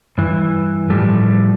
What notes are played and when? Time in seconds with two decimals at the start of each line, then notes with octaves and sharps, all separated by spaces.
0.18 G2 E3
0.90 A2 F3 G3 A3